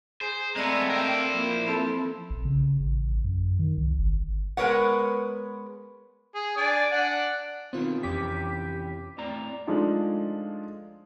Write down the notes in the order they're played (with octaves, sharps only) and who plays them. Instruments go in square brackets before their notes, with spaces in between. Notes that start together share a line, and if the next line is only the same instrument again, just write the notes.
[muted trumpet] G#4 [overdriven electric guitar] C5
[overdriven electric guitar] G#3 B3 [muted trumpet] A3 [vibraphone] C4 D5 E6 [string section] A#5
[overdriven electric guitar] A#4 C5 [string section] F5 G5
[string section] F3 A#3 E4
[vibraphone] C4 [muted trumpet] A4
[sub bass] A#1
C#3
A1
F#2
D#3
C2
G1
[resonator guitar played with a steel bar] G#3 B3 A#4 B4 C#5 F#5
[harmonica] G#4
D4 D5 G#5
D4 F#5
[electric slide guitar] B2 D#3 [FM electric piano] C4 F4
[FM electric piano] F2 D6 B6 [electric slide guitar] C3 E3 C#4 [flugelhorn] G4
[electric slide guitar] A2 C4 A#5 [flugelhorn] D5
[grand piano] F3 G#3 A3 D4 D#4 F4